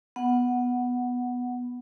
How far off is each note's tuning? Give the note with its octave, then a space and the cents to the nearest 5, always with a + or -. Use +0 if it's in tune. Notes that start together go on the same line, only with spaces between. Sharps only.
B3 +0 F#5 +0